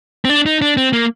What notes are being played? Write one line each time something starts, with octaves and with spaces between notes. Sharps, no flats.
C4
D4
D#4
D4
C4
A#3